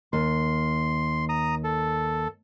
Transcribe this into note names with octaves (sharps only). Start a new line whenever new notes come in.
D#2 C6
A#5 D#6
A4